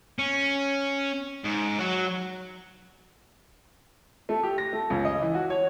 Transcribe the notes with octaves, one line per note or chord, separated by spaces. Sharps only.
C#4
G#2
F#3
A3
G4
A#6
A3
C#2
D#5
E3
F#4
C#5